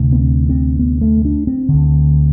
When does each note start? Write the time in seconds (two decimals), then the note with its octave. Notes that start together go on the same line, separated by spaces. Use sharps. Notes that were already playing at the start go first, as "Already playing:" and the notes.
Already playing: D2 C3
0.13 B3
0.20 C4
0.49 C4
0.79 B3
1.01 A3
1.25 D4
1.47 C4
1.69 D2 D3